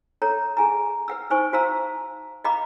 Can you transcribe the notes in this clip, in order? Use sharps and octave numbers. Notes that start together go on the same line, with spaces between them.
A4 C#5 A#5
G#4 G#5 A#5
B4 F#5 E6
D#4 B4 C5 G#5 C#6
F#4 C5 F5 A5 A#5 E6
D#5 F5 A#5 B5 D6